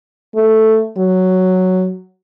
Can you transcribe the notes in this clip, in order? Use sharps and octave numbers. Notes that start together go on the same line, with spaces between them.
A3
F#3